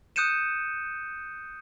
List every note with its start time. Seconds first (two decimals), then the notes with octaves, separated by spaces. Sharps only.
0.16 D#6 F#6 G6 C#7 D#7 E7